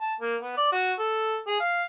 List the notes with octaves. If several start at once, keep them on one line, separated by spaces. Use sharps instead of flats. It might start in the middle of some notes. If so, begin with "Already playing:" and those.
A5
A#3
B3
D5
F#4
A4
G#4
F5